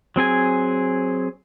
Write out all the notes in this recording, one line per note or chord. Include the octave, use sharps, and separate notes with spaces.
F#3 C4 G#4 G#5